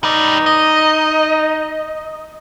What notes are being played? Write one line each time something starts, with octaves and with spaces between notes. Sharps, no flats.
D#4 B4 D5
D#5